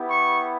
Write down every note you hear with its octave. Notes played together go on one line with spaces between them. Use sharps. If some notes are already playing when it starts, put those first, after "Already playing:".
Already playing: B3 E4 G4
C#6